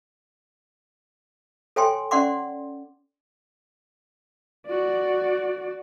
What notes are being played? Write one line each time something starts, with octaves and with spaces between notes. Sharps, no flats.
A4 C#5 G5 G#5 C6
C#4 D5 F#5 C6 D6
F#4 D5